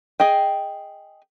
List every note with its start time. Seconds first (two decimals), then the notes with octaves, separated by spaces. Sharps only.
0.20 G#4 D#5 G5